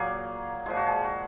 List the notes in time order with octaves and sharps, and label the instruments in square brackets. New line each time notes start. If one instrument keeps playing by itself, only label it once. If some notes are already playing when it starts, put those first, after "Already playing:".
Already playing: [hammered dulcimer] A#2 F#3 A#3 G#4
A#2 F3 G#3 G#4
F#4
G#4
F#4